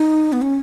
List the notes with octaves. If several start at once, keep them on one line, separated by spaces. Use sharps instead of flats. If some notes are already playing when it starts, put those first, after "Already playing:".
Already playing: D#4
B3
C#4